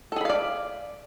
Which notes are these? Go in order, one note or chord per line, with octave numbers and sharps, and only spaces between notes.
G#4 A4 D5 F5 B5